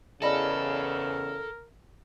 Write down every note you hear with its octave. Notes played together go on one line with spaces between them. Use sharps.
E2 C#3 A4 A#4 D5 D#5 B5